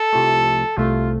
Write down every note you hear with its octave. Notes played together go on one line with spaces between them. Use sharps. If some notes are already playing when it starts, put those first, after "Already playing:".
Already playing: A4
C2 C3 F3 A3
C2 C3 A3 F4